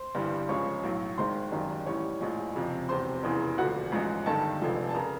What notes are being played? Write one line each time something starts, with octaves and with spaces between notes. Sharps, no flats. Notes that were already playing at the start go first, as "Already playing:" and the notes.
Already playing: C5 C6
G1 G2 E3 G3
C#2 C#3 F3 G#3 C#5 C#6
B1 A2 F#3
G#1 G#2 D#3 C5 C6
G#1 F#2 D#3 G3
A1 A2 E3 G3 C#5 C#6
A#1 A2 F3 G#3
F#1 F2 C3 F3
E1 E2 C3 C5 C6
F1 E2 C#3 E3
E1 D2 D3 F3 F#4 F#5
A1 G#2 F3 G#3
G1 G2 D#3 A4 A5
F1 F2 D3 F3 G#3
A5
C#3 A#4 A#5